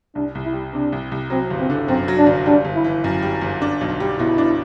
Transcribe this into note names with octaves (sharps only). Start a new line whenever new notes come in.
C2 D4
C2
E4
G3
C3 D4
C2
C2
F#3 C4
G1
C4
D3
F#2 C4
F#3
D4
G1
G3 D4
G1
E4
E3
F#2
G3
G1
D4
B1
G3
B2 E4
D4